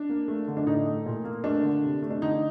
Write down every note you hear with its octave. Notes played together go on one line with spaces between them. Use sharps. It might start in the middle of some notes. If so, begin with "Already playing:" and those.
Already playing: D4
A#3
A3
D3
D4
A2 D#4
A3
A#2
A#3
A3 D4
D3
C3
A3
D4
D3 D#4